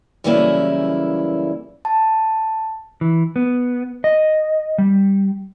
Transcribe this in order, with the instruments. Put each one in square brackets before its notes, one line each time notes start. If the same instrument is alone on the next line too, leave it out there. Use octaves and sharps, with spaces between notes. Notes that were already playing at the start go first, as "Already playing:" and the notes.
[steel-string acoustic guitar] F#2 C#3 E3 G3 A#3 E4
[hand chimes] A5
[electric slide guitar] E3
B3
D#5
G3